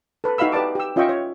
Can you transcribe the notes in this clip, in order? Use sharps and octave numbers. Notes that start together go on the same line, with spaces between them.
A4 B4
D#4 F#4 E5 F5 B5 E6
G4 B4 D5 A5 D6
G4 E6
C#4 F4 D#5 E5 G5 C#6
C#5